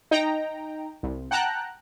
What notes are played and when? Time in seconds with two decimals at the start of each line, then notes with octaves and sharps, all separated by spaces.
0.11 D#4 G5 A#5
1.03 C2
1.31 F#5 G5 A5 A#5 F#6